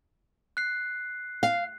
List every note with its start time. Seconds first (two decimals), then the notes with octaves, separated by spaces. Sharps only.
0.57 F#6 C7
1.43 F5